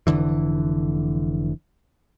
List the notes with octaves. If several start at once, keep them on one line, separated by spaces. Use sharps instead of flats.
F1 C#2 D3 E3